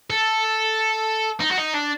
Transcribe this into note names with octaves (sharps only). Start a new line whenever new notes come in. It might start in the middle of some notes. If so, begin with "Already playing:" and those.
A4
D#4
F#4
D#4
D4